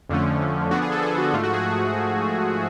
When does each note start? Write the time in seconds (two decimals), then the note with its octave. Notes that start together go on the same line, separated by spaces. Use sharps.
0.09 F2 D3 F3 A3 C#4
0.71 D3 F3 B3 D4 F#4
0.82 G#4
0.92 A4
1.02 G#4
1.18 F#4
1.33 G#2 F3 A3 F4
1.43 F#4
1.54 G#4